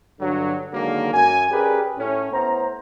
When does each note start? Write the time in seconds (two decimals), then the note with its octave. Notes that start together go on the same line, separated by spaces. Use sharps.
0.19 G2 D3 F#3
0.72 D3 D#3 F#3 G#3 A#3
1.12 F#2 G#5
1.51 C#4 G4 G#4 A#4 B4 D5
1.97 A2 C#4
2.32 A2 B3 C5 A#5